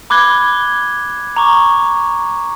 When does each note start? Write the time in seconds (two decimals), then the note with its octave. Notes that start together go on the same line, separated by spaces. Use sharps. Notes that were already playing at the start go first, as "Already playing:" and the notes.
0.10 B5 D6 F#6 G#6 G7
1.36 A#5 C#6 D6